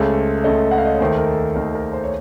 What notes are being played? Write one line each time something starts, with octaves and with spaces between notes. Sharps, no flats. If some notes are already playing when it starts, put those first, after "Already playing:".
Already playing: C#2 C#3 A3 C5
C#2 C#3 A3 D#5
F#5
F5
D#5
C#5
D#2 D#3 A3 C5
A#4
A4
D#2 D#3 A3 A#4
A#4
C5
C#5